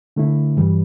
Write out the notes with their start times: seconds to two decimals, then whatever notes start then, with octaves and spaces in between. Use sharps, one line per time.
0.16 D3 A3 E4
0.56 G2 E3 G3